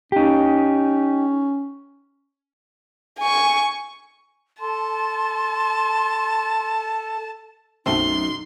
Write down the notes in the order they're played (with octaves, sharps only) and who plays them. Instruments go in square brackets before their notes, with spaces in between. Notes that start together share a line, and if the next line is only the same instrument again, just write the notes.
[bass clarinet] C#4 [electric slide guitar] D#4 G4
[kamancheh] G#5 C#6
[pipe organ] A4 [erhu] A5 [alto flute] C6
[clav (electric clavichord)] B1 A3 C4 [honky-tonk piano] F#2 [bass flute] D#4 [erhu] C6